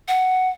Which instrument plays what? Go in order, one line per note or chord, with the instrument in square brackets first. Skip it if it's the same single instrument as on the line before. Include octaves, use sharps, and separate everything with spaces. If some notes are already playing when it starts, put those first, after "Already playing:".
[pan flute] F#5